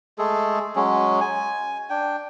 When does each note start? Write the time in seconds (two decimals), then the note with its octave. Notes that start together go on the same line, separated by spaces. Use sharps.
0.18 G#3 A3 G#4 A4
0.76 F#3 G#3 C#4
1.21 G#5
1.90 D4 G5